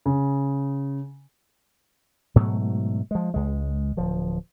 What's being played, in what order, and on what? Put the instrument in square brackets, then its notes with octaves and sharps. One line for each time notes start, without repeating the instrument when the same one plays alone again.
[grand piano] C#3
[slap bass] G#2 B2 F#3 A3
F3 G#3
C#2 G#3
D1 F3